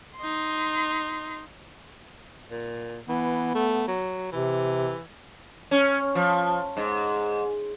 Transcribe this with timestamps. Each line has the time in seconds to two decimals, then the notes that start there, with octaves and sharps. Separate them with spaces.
0.18 D#4 C6
2.51 A#2
3.08 E3 B3
3.55 A3
3.88 F#3
4.32 C3 E3
5.71 C#4
6.15 F3
6.77 G#2